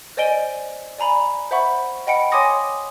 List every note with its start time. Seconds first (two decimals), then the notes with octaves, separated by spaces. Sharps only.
0.17 C5 D5 D#5 G#5 D7 G7
0.99 D5 G#5 A#5 B5
1.51 C5 E5 F#5 B5 C#6
2.07 D#5 F#5 G5 B5 C#7 D7
2.32 C#5 G#5 C6 D6 D#6 A#6